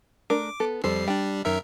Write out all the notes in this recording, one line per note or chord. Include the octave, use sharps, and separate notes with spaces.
A3 D4 A#4 D6
B3 A4
F2 G3 A4 C5 C7
G3 D4 G5
F#2 D#3 A#4 E5